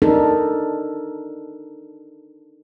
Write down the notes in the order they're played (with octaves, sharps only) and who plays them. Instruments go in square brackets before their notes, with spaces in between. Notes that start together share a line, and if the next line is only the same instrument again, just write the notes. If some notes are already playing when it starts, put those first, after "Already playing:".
[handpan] D4 D#4 A4 A#4